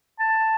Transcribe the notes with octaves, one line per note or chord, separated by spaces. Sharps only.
A5